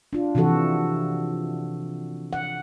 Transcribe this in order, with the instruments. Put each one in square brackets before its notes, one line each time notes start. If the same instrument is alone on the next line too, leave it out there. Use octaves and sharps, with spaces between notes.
[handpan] D4 F4
C3 E3 F3 F#4 A4
F#5